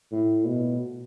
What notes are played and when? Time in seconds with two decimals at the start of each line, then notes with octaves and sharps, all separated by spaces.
0.12 A2
0.46 B2